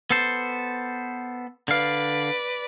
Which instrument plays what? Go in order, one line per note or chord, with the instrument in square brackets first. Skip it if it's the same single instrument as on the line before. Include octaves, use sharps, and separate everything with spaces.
[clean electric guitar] B3 A4 C5
[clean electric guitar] D3 F5 [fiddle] B4 D5